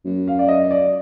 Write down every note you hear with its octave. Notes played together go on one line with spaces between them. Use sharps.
F#2
F5
D5
D#5
D5